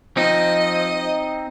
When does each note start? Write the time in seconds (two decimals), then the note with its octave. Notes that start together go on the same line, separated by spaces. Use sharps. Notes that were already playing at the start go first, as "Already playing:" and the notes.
0.17 F3 C4 D#4 D#5